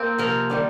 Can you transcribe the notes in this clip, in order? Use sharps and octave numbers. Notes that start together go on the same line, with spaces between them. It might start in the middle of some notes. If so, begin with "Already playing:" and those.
Already playing: A#3 C4
C3 F3 A#4
C3 D#3 G3